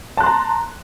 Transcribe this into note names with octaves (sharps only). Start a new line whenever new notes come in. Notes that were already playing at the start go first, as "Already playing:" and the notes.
A5 A#5 C6 F#6